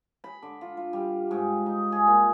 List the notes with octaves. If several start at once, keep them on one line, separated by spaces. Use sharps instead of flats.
B5
D3
F4
F4
G3
G#2
D#4
G#4
A#2